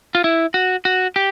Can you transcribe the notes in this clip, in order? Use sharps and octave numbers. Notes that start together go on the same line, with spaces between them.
F4
E4
F#4
F#4
G4